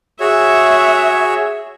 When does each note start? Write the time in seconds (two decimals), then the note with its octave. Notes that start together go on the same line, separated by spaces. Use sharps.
0.20 F#4 G#4 C#5 E5